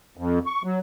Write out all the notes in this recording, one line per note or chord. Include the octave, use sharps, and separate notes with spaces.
F2
C#6
F#3